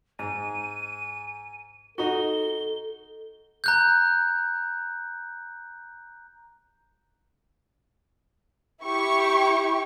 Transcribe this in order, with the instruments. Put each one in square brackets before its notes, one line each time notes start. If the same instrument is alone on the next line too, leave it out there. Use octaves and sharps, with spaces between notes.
[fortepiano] G#2 [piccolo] D#7
[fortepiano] D#4 F#4 [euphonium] A4 [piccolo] G7
[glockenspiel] A#5 F#6 G6
[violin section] E4 G4 C#6